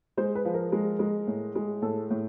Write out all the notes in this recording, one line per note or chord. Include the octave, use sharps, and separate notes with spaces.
G#3 C5
B4
F3
A#4
G#3
G#3
A2
G#3
A2 A4
A2